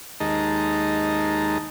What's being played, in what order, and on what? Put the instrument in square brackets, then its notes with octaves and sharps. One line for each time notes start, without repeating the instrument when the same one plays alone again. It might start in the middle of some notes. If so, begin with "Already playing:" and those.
[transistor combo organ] D#2 G#3 D#4 A5 A#5